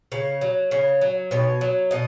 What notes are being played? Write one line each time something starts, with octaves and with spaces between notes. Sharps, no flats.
C#3 C#5
F#3
C#3 C#5
F#3
B2 C#5
F#3
B2 D#5